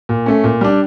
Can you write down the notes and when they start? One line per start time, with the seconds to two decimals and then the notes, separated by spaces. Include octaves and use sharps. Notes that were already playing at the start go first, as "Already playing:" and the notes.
0.09 A#2
0.26 A3 C#4
0.44 A#2
0.61 G3 D4